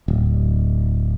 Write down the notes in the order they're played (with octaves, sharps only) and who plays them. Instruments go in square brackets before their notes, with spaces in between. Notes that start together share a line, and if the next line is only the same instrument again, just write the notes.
[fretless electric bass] D1